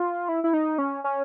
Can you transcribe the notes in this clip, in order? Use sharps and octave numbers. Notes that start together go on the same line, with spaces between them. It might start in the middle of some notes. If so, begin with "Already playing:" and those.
Already playing: F4
E4
E4
D#4
C#4
C#4